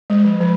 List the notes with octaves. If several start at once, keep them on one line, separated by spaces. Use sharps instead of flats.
G#3
F3
F3